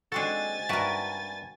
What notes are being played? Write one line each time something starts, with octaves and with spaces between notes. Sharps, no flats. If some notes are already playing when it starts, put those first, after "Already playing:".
G#3 C4 D4 F#4 A4 G#5 A6
G2 F#4 A#4 D5 E5